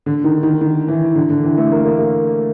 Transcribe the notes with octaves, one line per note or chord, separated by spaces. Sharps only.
D3
D#3
D#3
D#3
E3
D3
D3
E3
A3
A#3
A#3
A#3